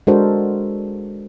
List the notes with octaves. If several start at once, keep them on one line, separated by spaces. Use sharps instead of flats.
G#3 D4 F#4 A4 A#4 C5